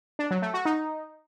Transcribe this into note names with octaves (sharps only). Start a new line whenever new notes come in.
D4
F#3
A3
F#4
D#4